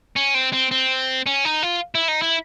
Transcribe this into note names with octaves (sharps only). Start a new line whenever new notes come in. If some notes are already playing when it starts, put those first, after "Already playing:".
C#4
C4
C4
C4
C#4
D#4
F4
E4
D#4
E4